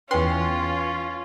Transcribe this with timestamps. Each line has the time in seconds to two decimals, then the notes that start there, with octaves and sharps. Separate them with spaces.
0.11 E2 C#4 F4 B4 G5 G#5 C6